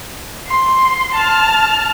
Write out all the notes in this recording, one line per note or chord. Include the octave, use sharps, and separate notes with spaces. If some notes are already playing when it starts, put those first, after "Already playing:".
C6
A5 F6